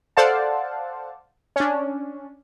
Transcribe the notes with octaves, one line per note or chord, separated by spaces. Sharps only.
A4 C5 D5 F5 F#5 A5
C#4 D4